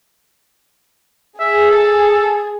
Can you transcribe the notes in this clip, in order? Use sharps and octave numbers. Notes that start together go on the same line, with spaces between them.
G#4 E5
A4